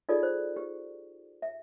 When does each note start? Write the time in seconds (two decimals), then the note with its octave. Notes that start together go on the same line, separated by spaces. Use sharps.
0.09 D#4 F4 G#4 A4 D5
0.23 C5
0.56 G4
1.42 E5